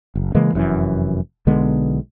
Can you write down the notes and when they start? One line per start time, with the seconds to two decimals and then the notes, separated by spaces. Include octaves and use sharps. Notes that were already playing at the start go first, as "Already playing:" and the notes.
0.15 F#1
0.35 C#3 E3 G#3 A#3
0.54 F1 F#2 E3
1.47 B1 D3 G#3 B3